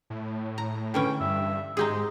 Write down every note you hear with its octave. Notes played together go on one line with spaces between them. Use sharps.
A2
A#5
D3 E3 C#4 G5
G2 E5
G#2 G#3 D#4 G4 G#4